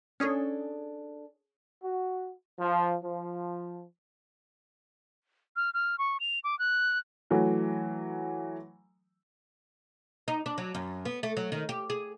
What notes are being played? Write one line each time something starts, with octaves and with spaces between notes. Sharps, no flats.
C#4 D4 G#4 A4 C#5
F#4
F3
F3
F6
F6
C#6
F7
D6
F#6
E3 F#3 A3
D#4
D4
F#3
F#2
B3
A3
F#3
D#3
G4
G#4